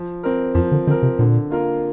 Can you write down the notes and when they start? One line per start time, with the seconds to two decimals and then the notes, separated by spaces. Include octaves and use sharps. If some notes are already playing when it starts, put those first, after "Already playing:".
Already playing: F3
0.23 C4 A#4
0.55 F2 F3
0.72 D3
0.87 D3 C4 A#4
1.03 C3
1.19 A#2 D3
1.51 A#3 F4 A#4